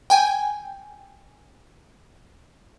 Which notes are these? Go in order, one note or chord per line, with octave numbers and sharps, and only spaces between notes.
G5 G#5